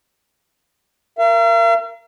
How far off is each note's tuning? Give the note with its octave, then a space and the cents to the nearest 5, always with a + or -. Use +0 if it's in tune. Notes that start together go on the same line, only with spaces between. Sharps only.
A#4 +0 F5 -45